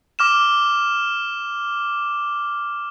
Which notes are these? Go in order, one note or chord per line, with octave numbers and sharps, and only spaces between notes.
D6 F6 E7